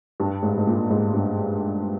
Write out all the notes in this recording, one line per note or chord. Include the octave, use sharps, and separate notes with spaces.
G2
G#2
G#2
A#2
G#2
G2